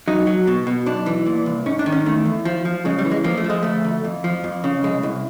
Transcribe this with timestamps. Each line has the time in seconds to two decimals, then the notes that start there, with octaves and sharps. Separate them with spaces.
0.08 F#3 D#4
0.27 F#3
0.47 B2
0.67 B2
0.86 B1 D4
1.06 E3
1.27 A#2
1.46 C2
1.66 G#2 C#4
1.79 D4
1.86 D#3
1.92 C#4
2.06 E2 A3
2.25 E2
2.45 F3
2.65 F3
2.85 C#3 G#3
2.98 G3
3.05 E3
3.11 G#3
3.24 F3 A#3
3.37 A3
3.44 F3
3.50 G#3
3.63 D2 A3
3.84 D2
4.04 F2
4.24 F3
4.44 F2
4.64 C#3
4.84 C2 G#3
5.03 C2